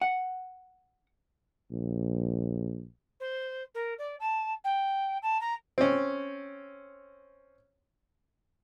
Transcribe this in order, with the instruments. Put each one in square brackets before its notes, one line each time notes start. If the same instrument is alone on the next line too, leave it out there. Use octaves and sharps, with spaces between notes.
[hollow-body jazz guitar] F#5
[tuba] A#1
[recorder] C5
A#4
D5
A5
G5
A5
A#5
[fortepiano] C4 C#4